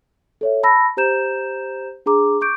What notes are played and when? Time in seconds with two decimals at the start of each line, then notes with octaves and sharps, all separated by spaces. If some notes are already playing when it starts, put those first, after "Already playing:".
0.41 A4 C#5 E5
0.63 A5 B5 E6 A#6
0.97 G4 C5 A#5 G6 E7
2.06 D4 G#4 A#5 D6
2.41 C#6 D6 G6 D7